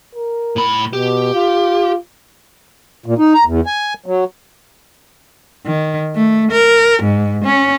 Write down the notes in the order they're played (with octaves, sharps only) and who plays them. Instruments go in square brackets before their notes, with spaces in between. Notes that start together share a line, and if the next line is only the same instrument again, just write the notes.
[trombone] A#4
[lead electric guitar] A2 B5
[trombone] B2 [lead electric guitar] G4
[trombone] F4
[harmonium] A#2
D#4
A#5
E2
G#5
F#3
[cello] D#3
A3
A#4
G#2
C#4